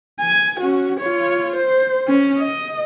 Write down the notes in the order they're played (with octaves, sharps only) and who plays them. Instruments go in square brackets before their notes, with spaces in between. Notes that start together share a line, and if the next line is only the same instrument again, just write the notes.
[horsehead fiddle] G#5
C#4 F#4
F4 C#5
C5
C#4
D#5